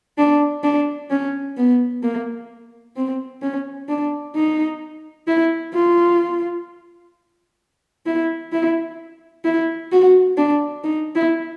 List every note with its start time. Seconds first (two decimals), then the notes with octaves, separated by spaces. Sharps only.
0.18 D4
0.64 D4
1.11 C#4
1.57 B3
2.03 A#3
2.96 C4
3.42 C#4
3.89 D4
4.35 D#4
5.27 E4
5.73 F4
8.06 E4
8.52 E4
9.44 E4
9.92 F#4
10.37 D4
10.84 D#4
11.16 E4